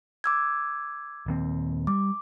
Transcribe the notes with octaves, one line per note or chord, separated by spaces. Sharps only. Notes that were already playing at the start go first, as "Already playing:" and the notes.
D6 E6 G#6
D#1 D#2 C4
G3 D6